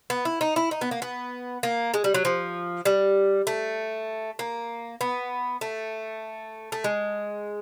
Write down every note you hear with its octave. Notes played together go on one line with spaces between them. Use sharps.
B3
E4
D#4
E4
D#4
B3
A#3
B3
A#3
G#3
G3
F#3
F3
G3
A3
A#3
B3
A3
A3
G#3